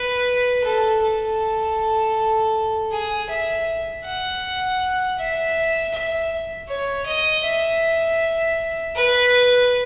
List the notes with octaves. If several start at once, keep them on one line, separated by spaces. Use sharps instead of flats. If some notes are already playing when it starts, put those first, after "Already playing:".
Already playing: B4
A4
A4
G#4
E5
F#5
E5
E5
C#5
D#5
E5
B4